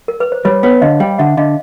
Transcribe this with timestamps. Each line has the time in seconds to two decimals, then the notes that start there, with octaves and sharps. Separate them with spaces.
0.08 A#4
0.20 B4
0.32 C5
0.45 G3 B4 C#5
0.63 B3 B4 C#5
0.81 D3 D#5 F5
1.00 G3 F5 G5
1.18 D3 E5 F#5
1.37 D3 D#5 F5